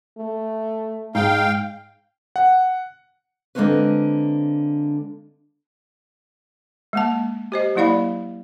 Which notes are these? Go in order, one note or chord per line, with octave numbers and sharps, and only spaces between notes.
A3
G#2 D#4 G#4 F5 G5
F#5
D3 G#3 A#3 C4 C#4 B4
G#3 A#3 A5
G4 C5 D#5
F#3 A#3 E4 D5 F5 B5